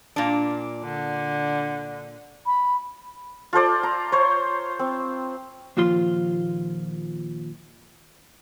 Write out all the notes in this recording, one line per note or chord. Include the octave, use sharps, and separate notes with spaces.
A#2 D4
D3
B5
F4 A4 C5 D5
A#5
C5 C#5
C4
D#2 A#2 F3 F4 C6